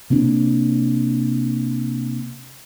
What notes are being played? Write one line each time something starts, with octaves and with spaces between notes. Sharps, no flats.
C3 A#3 C4 D4